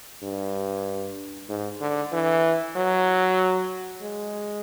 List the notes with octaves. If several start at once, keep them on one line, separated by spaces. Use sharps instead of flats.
G2
G#2
D3
E3
F#3
G#3